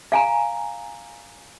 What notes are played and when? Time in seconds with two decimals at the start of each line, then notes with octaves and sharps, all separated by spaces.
0.12 F5 G#5 A#5